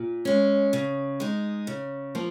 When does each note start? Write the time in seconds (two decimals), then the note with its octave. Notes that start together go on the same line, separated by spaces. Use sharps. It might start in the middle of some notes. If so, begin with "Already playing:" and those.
Already playing: A#2
0.25 G#3 C#4
0.73 C#3
1.20 G#3 D#4
1.67 C#3
2.15 F3 A#3